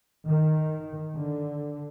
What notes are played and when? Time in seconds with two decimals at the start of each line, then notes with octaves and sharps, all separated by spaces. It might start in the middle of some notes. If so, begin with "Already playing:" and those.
0.24 D#3
1.17 D3